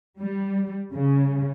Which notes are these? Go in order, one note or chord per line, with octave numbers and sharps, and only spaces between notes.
G3
C#3